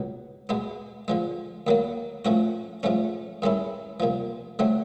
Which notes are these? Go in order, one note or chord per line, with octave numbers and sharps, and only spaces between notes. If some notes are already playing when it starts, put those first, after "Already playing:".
Already playing: C#2 B2 F#3
B2 G#3 B3
D3 F3 G#3
D#2 D#3 F#3 A#3
A2 F3 A3 C#4 F#4
G#2 F3 A3 C#4
G2 D#3 G#3 C#4 E4
C2 A#2 F3
D3 F#3 A3 C4